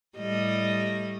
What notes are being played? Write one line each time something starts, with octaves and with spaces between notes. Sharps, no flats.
A2 G3 D#5